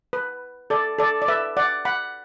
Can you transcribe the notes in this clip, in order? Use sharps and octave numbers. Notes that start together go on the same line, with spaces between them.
B4
A4 D5
A4 D5
D5
B4 E5
D5 F#5
F#5 B5